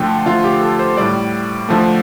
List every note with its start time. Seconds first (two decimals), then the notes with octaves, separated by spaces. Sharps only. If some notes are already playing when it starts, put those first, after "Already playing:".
Already playing: D3 F3 A3 G5
0.26 D3 F3 A3 F4
0.44 G4
0.61 A4
0.79 C5
0.97 A2 G3 D5
1.69 D3 F3 A3